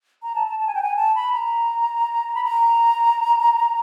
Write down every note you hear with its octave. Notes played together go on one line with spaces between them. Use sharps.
A#5
A5
A5
A5
G#5
G5
G#5
A5
B5
A#5
B5
A#5